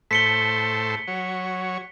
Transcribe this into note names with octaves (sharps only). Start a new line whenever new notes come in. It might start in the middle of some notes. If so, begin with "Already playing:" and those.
A2 A4 C5 B6 C#7 G7
F#3 C#5